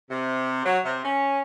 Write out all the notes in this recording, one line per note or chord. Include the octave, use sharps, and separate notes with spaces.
C3
F#3
C3
C#4